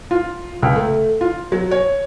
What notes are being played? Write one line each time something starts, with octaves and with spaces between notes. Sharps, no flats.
F4
C#2
A3
F4
F#3
C#5